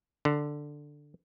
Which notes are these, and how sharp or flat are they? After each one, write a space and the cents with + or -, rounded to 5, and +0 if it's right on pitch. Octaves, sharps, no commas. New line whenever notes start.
D3 +5